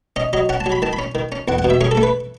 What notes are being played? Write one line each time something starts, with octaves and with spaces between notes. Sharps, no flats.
C#4 D#5
F#3 D#5
C#4 F#5
A5
F#3
B5
D#3 A5
B5
C#4
D#3
C#4
E2 F#5
F#5
B2
E5
C#4 G#4
A4
A3
B4